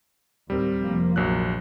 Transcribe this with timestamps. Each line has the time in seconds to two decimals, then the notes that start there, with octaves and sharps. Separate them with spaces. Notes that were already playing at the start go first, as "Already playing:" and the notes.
0.50 D#2 A2 G3 C4 A#4
0.82 F1 F3 A#3
1.16 A#1 F#3 F#6